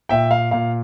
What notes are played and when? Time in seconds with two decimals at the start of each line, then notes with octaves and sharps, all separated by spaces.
0.09 A#2 E5 G5
0.31 F5
0.51 A#2 F5